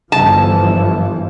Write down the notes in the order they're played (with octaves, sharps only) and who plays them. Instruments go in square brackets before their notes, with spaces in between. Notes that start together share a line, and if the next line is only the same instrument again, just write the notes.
[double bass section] G1 E3 F3 [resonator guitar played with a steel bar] A5